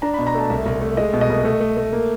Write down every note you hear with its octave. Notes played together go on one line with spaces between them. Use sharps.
D4 A#5
B5
B2
A#5
A3 A5
C2 E5
C2
A3
G#3 D#5
B2
D#5
C2
A3
A3
A3
A#3